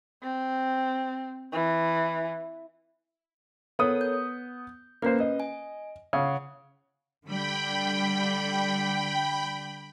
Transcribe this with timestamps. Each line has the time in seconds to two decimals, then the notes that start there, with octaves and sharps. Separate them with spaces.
0.23 C4
1.52 E3
3.79 B3 A4 A#4 C#5 D#6
4.01 G6
5.02 A#3 C#4 B4 C5
5.20 D#5
5.40 G#5
6.13 C#3 F#5
7.25 D3 G3 G5 B5